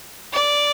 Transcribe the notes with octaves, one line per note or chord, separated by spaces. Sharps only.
D5